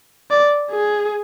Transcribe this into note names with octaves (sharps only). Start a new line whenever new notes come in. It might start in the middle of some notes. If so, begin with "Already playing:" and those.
D5
G#4